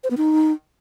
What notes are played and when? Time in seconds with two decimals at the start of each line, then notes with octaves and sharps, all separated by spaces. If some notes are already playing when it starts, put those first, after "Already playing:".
0.04 C5
0.10 B3
0.17 D#4